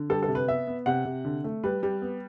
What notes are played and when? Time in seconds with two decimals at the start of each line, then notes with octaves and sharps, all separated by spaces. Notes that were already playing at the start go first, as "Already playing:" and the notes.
Already playing: D3
0.10 G3 A4
0.23 A4
0.28 C3
0.35 B4
0.48 B3 E5
0.67 B3
0.86 C3 F#5
1.05 C3
1.25 D3
1.44 A3
1.64 G3 B4
1.83 G3
2.02 B3